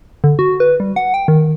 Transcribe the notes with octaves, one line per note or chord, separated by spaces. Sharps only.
D3
F#4
B4
G3
F#5
G5
D#3